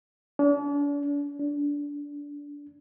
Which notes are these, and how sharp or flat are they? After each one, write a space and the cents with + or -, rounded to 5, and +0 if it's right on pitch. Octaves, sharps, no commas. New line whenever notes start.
D4 -40
D4 -20